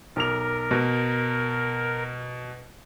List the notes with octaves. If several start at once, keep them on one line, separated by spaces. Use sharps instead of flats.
B1 A#4 D6 F7
B2